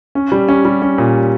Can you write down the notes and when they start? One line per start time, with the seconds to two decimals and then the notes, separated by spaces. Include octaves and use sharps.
0.15 C#4
0.32 G3
0.48 C#4
0.65 G3
0.82 C#4
0.98 A#2